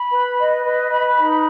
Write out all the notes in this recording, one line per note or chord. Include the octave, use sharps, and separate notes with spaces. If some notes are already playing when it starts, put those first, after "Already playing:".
Already playing: B5
B4
D#5
B4
B5
D#4